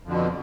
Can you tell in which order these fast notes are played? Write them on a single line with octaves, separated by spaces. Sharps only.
F2 D3 B2